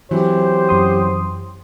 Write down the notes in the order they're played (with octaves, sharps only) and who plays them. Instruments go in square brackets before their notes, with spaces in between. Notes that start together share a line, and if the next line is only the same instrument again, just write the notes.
[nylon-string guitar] E3 F#3 C4 [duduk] G4 [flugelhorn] C5
[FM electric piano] F#2 C6 D#6